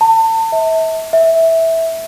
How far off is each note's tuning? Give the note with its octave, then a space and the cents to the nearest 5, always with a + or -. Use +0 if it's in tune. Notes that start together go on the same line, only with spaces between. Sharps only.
A5 +35
E5 -35
E5 -10